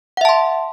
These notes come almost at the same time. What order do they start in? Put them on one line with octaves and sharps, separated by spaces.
F#5 E5 A5 C6